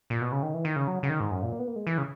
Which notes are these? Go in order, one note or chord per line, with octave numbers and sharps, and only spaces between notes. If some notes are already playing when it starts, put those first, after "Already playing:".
A#2
B2
C#3
D#3
E3
D#3
C#3
F#3
C#3
D#3
G#2
F#2
A#2
A#3
B3
A#3
G#3
E3
C#3